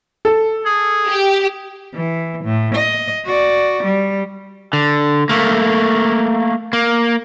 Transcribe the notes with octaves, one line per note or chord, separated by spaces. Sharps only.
A4
G#4
G4
E3
A2
D#5
F#4 D5
G3
D3
A3 A#3
A#3